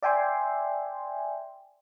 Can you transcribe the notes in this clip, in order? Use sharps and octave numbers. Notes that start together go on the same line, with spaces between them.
D5 E5 G5 G#5 C6